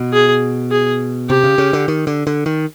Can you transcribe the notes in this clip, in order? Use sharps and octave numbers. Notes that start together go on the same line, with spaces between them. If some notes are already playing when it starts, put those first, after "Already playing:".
Already playing: B2
G#4
G#4
C3 G4
C#3
C#3
D3
D#3
D3
D3
D#3